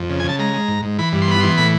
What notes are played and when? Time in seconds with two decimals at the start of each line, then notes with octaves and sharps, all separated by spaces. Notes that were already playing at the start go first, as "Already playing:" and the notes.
Already playing: F2
0.10 C#3
0.20 G#5
0.24 C#3 A5
0.39 G#3 A#5
0.54 G#3
0.68 G#2
0.83 G#2
0.99 E3 B5
1.12 G2
1.22 C6
1.28 B3 B5
1.41 E3 C6
1.57 A2 B5